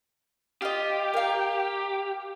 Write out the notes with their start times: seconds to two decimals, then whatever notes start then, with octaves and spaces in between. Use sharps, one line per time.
0.62 F4 G4 D#5
1.14 A#4 F5